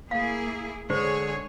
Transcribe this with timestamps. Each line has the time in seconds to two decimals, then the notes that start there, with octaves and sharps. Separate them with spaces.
0.11 A#3 E4 G#4 F5
0.90 D3 G#3 D4 G#4 C5 C#5